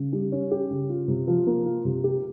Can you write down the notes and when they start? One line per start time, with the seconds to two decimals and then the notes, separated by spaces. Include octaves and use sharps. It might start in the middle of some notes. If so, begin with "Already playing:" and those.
Already playing: C#3
0.13 G3
0.32 C#4
0.51 G4
0.70 C#3
0.89 F4
1.08 C3
1.27 F3
1.47 A#3
1.66 F4
1.85 C3
2.04 G4